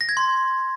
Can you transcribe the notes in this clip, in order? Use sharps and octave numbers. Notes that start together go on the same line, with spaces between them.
A#6
G#6
C6